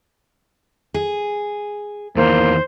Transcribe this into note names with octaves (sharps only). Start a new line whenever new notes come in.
G#4
E2 D#3 E3 A#3 C5